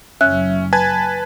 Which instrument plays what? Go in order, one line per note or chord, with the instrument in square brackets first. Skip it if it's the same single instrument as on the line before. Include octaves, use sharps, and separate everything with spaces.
[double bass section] F#1 F#3 [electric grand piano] C#4 [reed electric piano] E5 [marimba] F#6
[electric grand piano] B4 A5 G#6 [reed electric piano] G#5